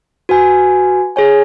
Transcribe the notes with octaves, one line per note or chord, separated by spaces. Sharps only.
F#4 B4 G#5
G#4 C#5 G#5